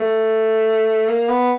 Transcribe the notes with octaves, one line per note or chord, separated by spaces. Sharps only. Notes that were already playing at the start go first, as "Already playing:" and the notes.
Already playing: A3
A#3
B3